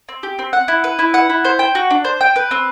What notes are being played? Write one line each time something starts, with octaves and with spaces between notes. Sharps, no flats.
C4
G4
C4
F#5
E4
B4
E4
F#5
E4
C5
G5
F#4
D4
C5
G5
B4
C4